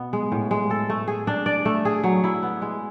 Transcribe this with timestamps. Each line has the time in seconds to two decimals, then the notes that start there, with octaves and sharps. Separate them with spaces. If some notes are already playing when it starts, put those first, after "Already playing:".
Already playing: B2 B3
0.13 G#3
0.32 A2
0.51 G#3
0.70 A4
0.90 A3
1.08 G#4
1.27 D4
1.46 D5
1.65 A3
1.85 G#4
2.04 F#3
2.24 E4
2.43 B3
2.62 G#3